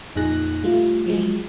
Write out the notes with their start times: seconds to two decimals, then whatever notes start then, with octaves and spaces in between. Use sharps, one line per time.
0.15 F2 A#2 D#4 G#4 F#6 A#6
0.64 G3 A3 F4
1.06 F3 F#3 G#3